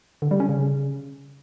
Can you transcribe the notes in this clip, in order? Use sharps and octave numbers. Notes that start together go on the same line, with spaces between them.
D3
G3
C#4
C#3